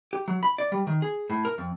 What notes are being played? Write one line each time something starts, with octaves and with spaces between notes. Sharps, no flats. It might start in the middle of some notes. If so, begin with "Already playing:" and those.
G4
F#3
B5
D5
G3
D#3
G#4
A2
A#4
F2